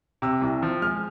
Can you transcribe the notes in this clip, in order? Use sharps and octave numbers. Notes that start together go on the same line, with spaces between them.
C3 E6
C2
F3
G#3 F6